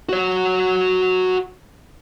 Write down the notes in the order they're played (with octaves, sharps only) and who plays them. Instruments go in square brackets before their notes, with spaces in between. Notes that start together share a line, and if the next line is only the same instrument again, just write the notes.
[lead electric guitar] F#4 C#5